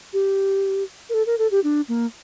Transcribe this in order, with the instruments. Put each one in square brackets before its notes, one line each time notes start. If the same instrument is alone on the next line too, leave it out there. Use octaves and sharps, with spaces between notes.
[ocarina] G4
A#4
A4
A#4
A4
G4
D4
A#3